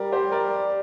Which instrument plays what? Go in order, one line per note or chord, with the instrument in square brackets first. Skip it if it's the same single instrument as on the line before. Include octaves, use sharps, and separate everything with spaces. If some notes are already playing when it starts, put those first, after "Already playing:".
Already playing: [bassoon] G3 [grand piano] A#4 D5
[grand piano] G4 C5
A#4 D5